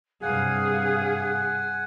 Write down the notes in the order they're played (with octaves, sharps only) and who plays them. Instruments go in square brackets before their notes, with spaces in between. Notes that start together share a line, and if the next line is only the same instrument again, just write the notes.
[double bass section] G2 C3 [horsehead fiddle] G#4 [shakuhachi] F5 [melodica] F#5 G#5